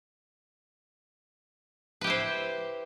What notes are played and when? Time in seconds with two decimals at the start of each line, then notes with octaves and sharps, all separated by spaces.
2.01 B4
2.04 G4
2.07 E4
2.10 C5